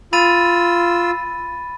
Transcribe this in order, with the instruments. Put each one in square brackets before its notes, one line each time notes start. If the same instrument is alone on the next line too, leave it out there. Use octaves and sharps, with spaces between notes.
[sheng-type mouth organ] F4 E6 [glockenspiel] B5 A6 D#7